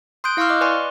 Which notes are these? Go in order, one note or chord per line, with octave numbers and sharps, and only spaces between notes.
C6 D#6 F#6 G6 D7
E4 F5 C6 C#6 E6 F6
D#5 D6 F#6
B4 D5 G#5 C6 C#6